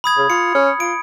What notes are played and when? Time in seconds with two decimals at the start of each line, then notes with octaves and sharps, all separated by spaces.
0.04 B5 D#6 G#6
0.18 C#3
0.30 F4 C#7
0.55 C#4
0.80 F4 D7